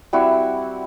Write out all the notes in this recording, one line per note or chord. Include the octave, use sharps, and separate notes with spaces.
G3 C4 E4 F#4